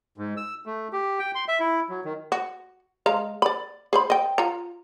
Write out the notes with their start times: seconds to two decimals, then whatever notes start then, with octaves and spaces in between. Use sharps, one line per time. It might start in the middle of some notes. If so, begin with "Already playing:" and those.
0.18 G#2
0.37 E6
0.66 A3
0.93 G4
1.19 G5
1.35 C6
1.48 E5
1.60 E4
1.89 F#3
2.05 D#3
2.32 F#4
3.06 G#3 F5 A#5
3.42 D5 B5
3.93 G#4 C5 B5
4.10 D#5 G5
4.38 F4 A#5